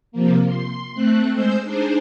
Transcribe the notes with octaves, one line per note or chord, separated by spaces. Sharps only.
C3 F3 A#3
C6
A3 C4 F#6
G#3 C5 E6 G6
D4 D#4 G#4 C5